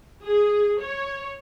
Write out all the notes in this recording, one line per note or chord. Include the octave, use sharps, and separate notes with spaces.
G#4
C#5